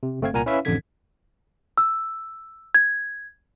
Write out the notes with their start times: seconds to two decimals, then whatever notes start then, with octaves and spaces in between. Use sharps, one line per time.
0.03 C3
0.21 G1 A3 C4 F5 G#6
0.33 C2 A#2 A#4 F#5 G#5 A#5
0.46 C#4 E4 B4 C#5 E5 F5
0.65 A1 F2 D3 G#6 B6
1.78 E6
2.75 G#6